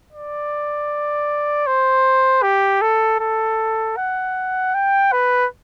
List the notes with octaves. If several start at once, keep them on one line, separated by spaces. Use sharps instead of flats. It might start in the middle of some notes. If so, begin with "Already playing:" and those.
D5
C5
G4
A4
A4
F#5
G5
B4